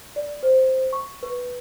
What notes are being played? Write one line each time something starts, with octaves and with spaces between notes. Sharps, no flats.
D5
C5
C#6
B4